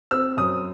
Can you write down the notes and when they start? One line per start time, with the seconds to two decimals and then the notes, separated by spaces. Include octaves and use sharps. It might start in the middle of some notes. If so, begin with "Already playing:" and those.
0.11 C4 E6
0.37 F#2 D#6